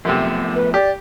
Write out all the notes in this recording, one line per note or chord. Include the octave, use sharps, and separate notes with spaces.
F#2 C3 F3 A3 B3
B4
G4 D5